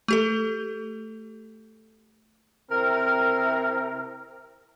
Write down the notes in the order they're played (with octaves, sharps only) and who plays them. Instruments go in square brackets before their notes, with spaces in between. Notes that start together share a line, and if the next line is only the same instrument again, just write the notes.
[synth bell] A3 G4 A4
[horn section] C3 C4 E4 A#4